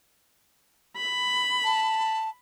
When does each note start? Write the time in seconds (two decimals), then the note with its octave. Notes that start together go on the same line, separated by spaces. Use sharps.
0.97 B5
1.64 A5